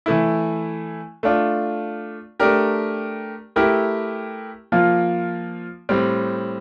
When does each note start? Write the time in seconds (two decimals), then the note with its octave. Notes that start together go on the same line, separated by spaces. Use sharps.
0.06 E3 A3 E4
1.23 A3 D4 F4
2.40 A3 D4 G4 A#4
3.56 A3 E4 G4 A#4
4.72 F3 A#3 F4
5.89 A2 G3 C4